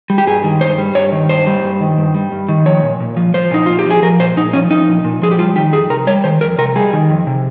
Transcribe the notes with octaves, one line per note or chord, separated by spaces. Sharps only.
G3
G4
G2 G#4
D#3
G2 C5
G3
G2 C#5
D#3
G2 C5
G3
G2
D#3
G2
G3
G2
D#3
F3 C#5
A#2
A#2
F3
F3 C5
A#2 D#4
A#2 F4
G4
F3 G#4
F3 A#4
A#2 C5
A#2 D#4
F3 C#4
F3 D#4
A#2
A#2
F3 G#4
G4
G3 F4
D#3 G4
F2 G#4
C3 A#4
G3 C#5
D#3 C5
F2 A#4
C3 A#4
G3 G#4
D#3
F2
C3